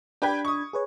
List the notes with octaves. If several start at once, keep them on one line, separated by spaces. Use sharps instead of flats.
D4 G4 B4 G5 B5 G#6
C#6 D#6
G#4 B4 C#5